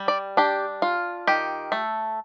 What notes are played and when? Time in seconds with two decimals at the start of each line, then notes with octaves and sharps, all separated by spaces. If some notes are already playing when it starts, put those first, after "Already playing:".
Already playing: G3
0.08 D5
0.37 D4 G4
0.82 F4
1.27 D#3 G4
1.72 A3